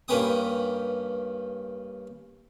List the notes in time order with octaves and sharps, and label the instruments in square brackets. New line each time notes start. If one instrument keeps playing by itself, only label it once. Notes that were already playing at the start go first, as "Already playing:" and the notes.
[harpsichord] G2 A#3 C#4 B4 G5 D#6